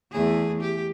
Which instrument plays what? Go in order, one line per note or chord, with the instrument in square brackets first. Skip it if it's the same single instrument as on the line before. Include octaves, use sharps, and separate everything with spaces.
[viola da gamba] E2 A3 G#4
G4